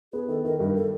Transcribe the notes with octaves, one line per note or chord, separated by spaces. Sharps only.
B3 G#4
D#3 A4
D#3 A#4
G2 A#4
A4